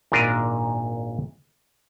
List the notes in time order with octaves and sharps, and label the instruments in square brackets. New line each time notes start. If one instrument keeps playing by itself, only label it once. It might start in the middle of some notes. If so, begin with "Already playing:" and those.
[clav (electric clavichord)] G#1 A#2 D4 A#4 D#5 E5